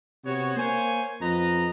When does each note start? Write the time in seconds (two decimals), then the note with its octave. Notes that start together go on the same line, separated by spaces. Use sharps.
0.25 C3 B3 F#4 C#5
0.56 A#3 C5 C#5 G#5
1.21 F2 B4 D#5 A#5